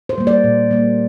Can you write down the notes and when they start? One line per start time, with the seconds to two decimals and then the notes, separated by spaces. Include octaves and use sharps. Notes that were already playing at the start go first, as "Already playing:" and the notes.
0.09 C5
0.18 G3 A#3
0.27 D5
0.44 A#2
0.71 G3 A#3